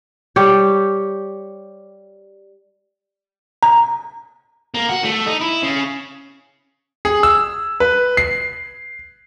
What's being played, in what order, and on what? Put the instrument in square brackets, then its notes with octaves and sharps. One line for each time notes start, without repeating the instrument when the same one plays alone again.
[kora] G3 G4 C#5
[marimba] A#5
[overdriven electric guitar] A#3
F#4
A3
D#4
E4
C#3
[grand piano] G#4
E6
B4
C7